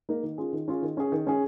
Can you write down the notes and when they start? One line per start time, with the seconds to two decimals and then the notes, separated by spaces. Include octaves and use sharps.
0.09 A#3 D#4 A#4
0.23 D#3
0.38 C#4 F4 G#4
0.53 D#3
0.68 C#4 F4 G#4
0.82 D#3
0.97 C#4 G#4
1.12 D#3
1.27 C#4 G#4